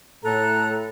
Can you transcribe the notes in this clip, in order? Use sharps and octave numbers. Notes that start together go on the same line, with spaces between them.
A2 A4 A#5 F#6